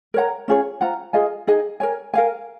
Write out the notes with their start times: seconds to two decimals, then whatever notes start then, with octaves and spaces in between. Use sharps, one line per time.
0.14 A#4 C#5 F#5 A#5
0.48 C#4 F4 G#4 C#5
0.81 F4 C5 F#5 A#5
1.13 F4 G#4 D#5 G#5
1.47 D#4 G#4 D#5 G#5
1.80 A#4 C#5 G#5
2.14 A#4 F5 G#5